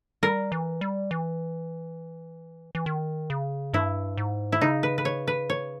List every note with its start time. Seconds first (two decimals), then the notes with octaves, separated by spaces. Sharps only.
0.23 G3 A#4
0.52 E3
0.81 G3
1.11 E3
2.75 E3
2.86 D#3
3.30 C#3
3.73 G2 E4
4.17 G#2
4.52 E4
4.61 C#3 D#4
4.83 B4
4.98 B4
5.05 C#5
5.27 B4
5.50 C#5